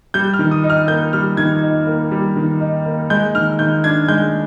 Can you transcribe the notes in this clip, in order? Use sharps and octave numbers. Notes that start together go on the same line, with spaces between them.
G3 G6
F6
D#3
D#6
D#4
F6
A#3 G6
G3 F6
D#3 G#6
D#4
A#3
G3
D#3
D#4
A#3
G#3 G6
D#3 F6
D#3 G6
D4 G#6
G#3 G6